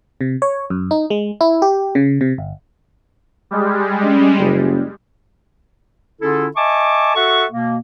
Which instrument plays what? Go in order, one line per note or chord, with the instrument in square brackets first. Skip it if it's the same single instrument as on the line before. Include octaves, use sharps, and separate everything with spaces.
[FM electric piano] C3
C#5
F#2
D#4
G#3
E4
G4
C#3
C3
G1
[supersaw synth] G3 G#3
[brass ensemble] C#4
F#1
[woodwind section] D3 C#4 E4 F4 G#4 A4
D#5 E5 G#5 A5 C#6 D6
F#4 A4 E5 F#5 C#6
B2 A#3